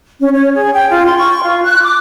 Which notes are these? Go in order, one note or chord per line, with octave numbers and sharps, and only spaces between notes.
C#4
C#5
G#4
G5
F4
C6
C#6
F4
F#6
D6